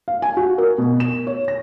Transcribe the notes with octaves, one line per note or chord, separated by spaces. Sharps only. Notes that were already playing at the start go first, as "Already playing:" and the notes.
F5
G#5
F#4
A#4
B2
E7
C#5
A#6